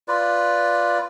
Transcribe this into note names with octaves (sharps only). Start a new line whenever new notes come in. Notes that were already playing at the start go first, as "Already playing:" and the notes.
F4 B4 D5